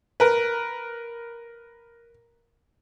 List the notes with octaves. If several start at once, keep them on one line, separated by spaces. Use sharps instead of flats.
A#4 B4